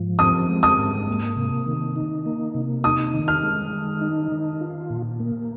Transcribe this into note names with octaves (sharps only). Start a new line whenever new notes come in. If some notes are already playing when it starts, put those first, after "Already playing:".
Already playing: G#2 F3
C4 D#6
G#3
D#6
G#2
A#3
C3
D#3
D#4
A#3
C3
D#4 D#6
D#3
F6
G#3
D#3
D#4
D#3
F4
A#2
A#3